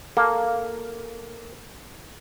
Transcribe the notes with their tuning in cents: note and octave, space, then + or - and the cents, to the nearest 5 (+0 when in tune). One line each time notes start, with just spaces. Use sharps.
A#3 +0 A4 +0